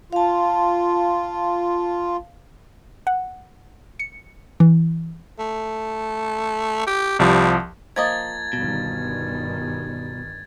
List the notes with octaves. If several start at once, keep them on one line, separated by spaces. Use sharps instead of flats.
F4 F5 A5
F#5
C#7
E3
A3
G4
C2 F3 G3
F3 A#3 D#5 G#6 A6
G1 B2 D#3 G3